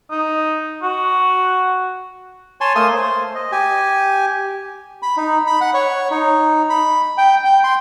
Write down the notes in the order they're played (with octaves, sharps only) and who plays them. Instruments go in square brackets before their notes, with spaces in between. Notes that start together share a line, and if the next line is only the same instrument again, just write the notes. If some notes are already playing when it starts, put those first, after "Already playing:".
[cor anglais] D#4
F#4
[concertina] C#5 G#5 A5 C6
A3 A#3 G#5 C6 D#6
C5
D#5
G4 G#5
B5
D#4
B5
F#5
C#5
D#4
B5
G5
G5
C6